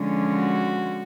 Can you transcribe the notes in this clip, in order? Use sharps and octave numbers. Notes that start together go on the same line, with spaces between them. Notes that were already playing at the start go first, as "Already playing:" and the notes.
Already playing: D3 F3 G#3 C#4
F#4